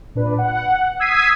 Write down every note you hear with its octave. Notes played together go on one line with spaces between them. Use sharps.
A#2 D4 B4
F#5
D#6 E6 G#6 B6 C7 D#7